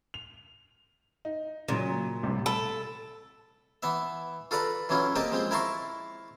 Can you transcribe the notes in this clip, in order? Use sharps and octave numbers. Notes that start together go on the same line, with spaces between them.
F7
D#4
A#2 C#3 F#3
A1 C3 G3
A4 B5
E3 B3 E5
F4 A4 B4 D5 A#5
E3 F#3 C#4 E4 F4
A#3 C4 G4 A#4 D#5 A5
F3 G#3 C4
E4 A#4 A5 A#5 C6 C#6